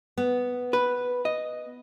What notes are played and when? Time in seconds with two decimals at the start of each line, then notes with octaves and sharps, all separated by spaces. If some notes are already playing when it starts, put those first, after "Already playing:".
0.17 B3
0.73 B4
1.25 D#5